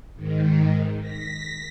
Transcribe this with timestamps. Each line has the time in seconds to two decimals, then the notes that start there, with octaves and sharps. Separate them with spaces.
0.15 G#2 D#3
0.99 A#6 B6